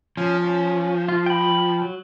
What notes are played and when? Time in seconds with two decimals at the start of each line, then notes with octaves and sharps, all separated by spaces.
0.17 F3 C#4
0.44 C#4
1.09 F4
1.26 G5 B5
1.82 F#3